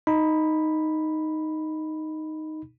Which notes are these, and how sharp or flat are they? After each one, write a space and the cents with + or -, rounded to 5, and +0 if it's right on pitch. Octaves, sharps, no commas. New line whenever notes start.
D#4 +0 B5 +0